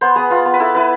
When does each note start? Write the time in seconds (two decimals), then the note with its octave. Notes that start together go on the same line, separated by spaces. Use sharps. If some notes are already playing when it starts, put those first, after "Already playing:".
0.01 B3 C5
0.16 B3 G#4
0.30 B3 F4
0.45 B3
0.54 B4
0.60 E4 A4
0.75 E4 B4